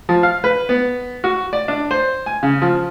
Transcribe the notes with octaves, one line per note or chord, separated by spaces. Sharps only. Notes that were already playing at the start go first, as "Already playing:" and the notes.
F3
F5
B4
B3
F#4
D5
D4
C5
G#5
C#3
F3